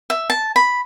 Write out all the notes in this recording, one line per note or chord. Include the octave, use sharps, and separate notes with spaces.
E5
A5
B5